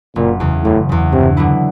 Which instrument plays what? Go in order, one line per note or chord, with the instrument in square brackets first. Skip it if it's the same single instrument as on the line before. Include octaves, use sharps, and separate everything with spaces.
[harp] F#1 [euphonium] A#2
[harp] E2 C#3
[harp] F#1 [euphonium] A2
[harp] E2 C#3
[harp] G2 [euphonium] C3
[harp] D3 F#3 B3 E4